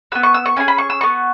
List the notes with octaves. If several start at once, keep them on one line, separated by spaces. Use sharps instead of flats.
B3 F#4 E6
C#6
E6
C#6
C#4 E4 G#4 G#5
B5
C#6
E6
B3 F#4 C#6